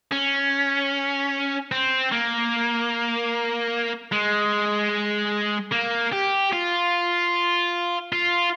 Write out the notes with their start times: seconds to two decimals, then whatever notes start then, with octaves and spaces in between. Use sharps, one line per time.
0.12 C#4
1.72 C4
2.12 A#3
4.12 G#3
5.72 A#3
6.13 G4
6.53 F4
8.13 F4